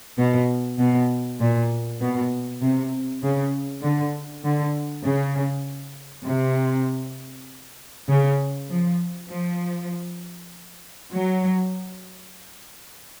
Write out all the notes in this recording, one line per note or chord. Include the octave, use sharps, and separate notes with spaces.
B2
B2
A#2
B2
C3
C#3
D3
D3
C#3
C3
C#3
F3
F3
F#3